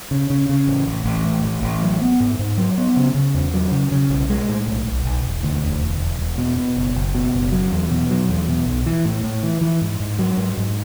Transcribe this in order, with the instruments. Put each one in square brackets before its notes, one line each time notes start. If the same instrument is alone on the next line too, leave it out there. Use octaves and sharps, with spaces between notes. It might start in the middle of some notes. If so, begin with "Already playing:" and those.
[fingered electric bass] C#3
C#3
C#3
A1
A1
A1
A2
A1
A1
F#3
B3
G#2
G#2
F#3
B3
C#3
C#3
E2
F#3
C#3
C#3
B1
G#3
A2
B1
B1
B1
E1
D2
E1
E1
E1
E1
B2
B2
F#1
F#1
B2
F#1
F#3
E2
B2
F#3
E2
B2
B1
E3
A2
A2
E3
E3
G#2
G#2
F#3
G#2
G#2